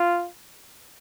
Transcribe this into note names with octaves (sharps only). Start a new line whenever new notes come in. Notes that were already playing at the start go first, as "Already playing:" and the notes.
Already playing: F4